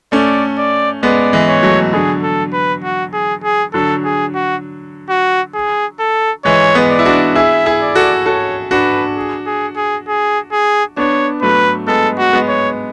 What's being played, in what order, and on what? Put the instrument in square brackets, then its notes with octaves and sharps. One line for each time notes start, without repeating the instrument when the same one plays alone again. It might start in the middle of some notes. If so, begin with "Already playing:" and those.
[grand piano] A3 C#4 [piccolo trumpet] D5
[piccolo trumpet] D5
[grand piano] G#3 B3 [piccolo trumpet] D5
[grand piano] E3 G#3
[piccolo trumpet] C#5
[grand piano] F#3 A3
[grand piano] D3 F#3 [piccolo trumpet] G#4
[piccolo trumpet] A4
B4
F#4
G#4
G#4
[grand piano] D3 F#3 [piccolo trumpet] A4
[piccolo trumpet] G#4
F#4
F#4
G#4
A4
[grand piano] E3 G#3 [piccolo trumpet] C#5
[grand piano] G#3 B3
[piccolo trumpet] D5
[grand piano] E4
D4 F#4
[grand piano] E4 G#4 [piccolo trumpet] E5
[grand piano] E4 G#4
[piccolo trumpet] D5
[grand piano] F#4 A4
[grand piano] F#4 A4 [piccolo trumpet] C#5
[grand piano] D4 F#4 [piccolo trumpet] B4
[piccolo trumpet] G#4
G#4
G#4
G#4
G#4
[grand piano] B3 D4 [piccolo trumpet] C#5
[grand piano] F#3 A3 [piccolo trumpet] B4
[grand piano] G#3 B3 [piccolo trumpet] A4
[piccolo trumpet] F#4
[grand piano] G#3 B3
[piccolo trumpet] C#5